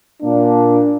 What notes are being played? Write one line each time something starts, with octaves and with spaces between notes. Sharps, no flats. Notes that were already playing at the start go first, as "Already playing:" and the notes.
A#2 A#3 D4